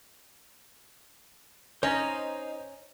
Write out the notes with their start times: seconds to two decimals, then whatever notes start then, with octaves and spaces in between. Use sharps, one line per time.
1.83 C#4 D#4 C5 D#5 A#5